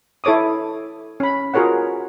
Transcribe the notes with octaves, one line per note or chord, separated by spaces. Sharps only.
E4 A4 C#5 D6 D#6
C#4 B5
F4 F#4 G#4 A#4 C#5 F#5